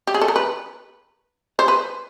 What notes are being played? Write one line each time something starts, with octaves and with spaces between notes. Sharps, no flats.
G4
G#4
A4
A#4
B4
C5
B4